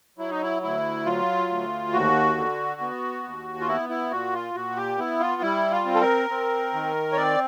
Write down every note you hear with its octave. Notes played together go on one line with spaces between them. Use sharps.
F#3 E4
D#4
E4
D2 E4
F#3 F4
D2
D#2 F#4
D3
B3
D#2
F4
B3 E4
E4
A#2 F#4
F4
A#2 F#4
G4
B3 E4
F4
G3 E4
F4
C4
A4
A#4
C4
D#3
C#5
C4 D5